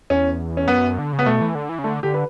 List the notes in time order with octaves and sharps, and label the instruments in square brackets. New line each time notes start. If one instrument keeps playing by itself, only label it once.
[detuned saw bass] E2 [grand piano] C#4
[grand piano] C#4
[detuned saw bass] F#2 [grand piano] B3
[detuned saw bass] D3
C#3
[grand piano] B3
[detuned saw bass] B2 [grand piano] A3
[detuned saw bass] E3
D3
E3
C#3
[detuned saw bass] D3 [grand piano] A3
[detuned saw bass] D3 [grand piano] G4
[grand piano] B4